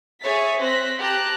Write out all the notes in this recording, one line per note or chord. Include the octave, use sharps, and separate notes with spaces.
G#4 C#5 E5 A6 B6
C4 C5 F#6 A#6 B6
G4 A5 A#5 F#6